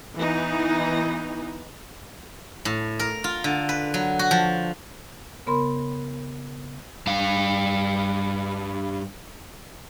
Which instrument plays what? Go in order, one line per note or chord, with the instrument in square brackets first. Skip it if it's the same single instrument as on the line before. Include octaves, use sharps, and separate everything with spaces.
[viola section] E3 B3 D#4
[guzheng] A2
A#4
F4
D3
B4
F#3
F#4
F3
[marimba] C#3 B3 A#4 B5 C6
[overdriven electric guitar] G2 F5